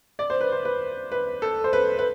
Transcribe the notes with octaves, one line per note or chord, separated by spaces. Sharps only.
D5
C5
B4
C5
B4
B4
A4
C5
B4
B4